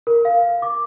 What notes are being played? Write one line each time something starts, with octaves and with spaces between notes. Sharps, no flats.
A#4
F5
D6